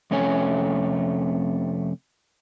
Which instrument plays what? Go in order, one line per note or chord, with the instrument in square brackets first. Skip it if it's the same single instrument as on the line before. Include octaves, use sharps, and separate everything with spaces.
[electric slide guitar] F2 C3 A3 C#4 C#5 G#5